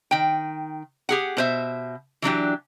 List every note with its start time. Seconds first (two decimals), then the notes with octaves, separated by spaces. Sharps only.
0.11 D#3 G5
1.09 G4 G#4 F#5
1.37 B2 C5 E5
2.22 E3 F#3 D4 G4